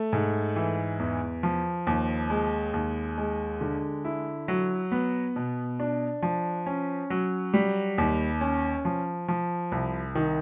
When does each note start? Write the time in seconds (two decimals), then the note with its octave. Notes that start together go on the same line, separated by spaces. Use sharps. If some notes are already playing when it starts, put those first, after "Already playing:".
Already playing: A3
0.13 G#2
0.56 E3
0.99 E2
1.43 F3
1.87 D#2
2.30 G#3
2.74 D#2
3.18 G#3
3.61 D3
4.05 E4
4.48 F#3
4.91 B3
5.36 B2
5.80 D4
6.22 F3
6.66 C#4
7.10 F#3
7.54 G3
7.98 D#2
8.41 C#4
8.85 F3
9.28 F3
9.72 C2
10.15 D#3